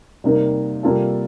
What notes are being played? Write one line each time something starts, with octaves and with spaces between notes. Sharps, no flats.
C3 G3 A#3 D#4 A#4
C3 G3 A#3 F4 A4